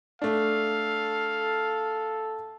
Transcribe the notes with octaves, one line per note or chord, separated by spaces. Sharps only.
A3 D4 A4 F5